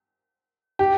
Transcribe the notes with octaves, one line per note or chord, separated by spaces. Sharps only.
G4